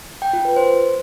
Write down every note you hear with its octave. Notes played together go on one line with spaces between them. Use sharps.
G5
F4
B4
C5